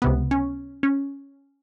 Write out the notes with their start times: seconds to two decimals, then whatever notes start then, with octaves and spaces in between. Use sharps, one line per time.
0.02 C#2 C3 B3
0.31 C#4
0.83 C#4